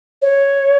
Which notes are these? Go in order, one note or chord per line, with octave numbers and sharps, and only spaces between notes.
C#5